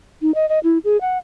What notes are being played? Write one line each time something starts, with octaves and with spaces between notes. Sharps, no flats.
D#4
D#5
D#5
E4
G#4
F#5